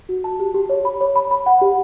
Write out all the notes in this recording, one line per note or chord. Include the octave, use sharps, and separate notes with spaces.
F#4
A5
G4
G4
C#5
B5
C#5
B5
B5
F#5
G4